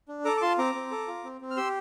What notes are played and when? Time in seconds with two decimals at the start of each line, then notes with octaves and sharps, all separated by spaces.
0.08 D4
0.25 A4 A#5 D6
0.37 D6
0.41 F4 A5 C6
0.58 C4 A#5 D6
0.75 C4
0.91 A4
1.08 F4
1.24 C4
1.41 C4
1.51 F6
1.57 G4 C6 E6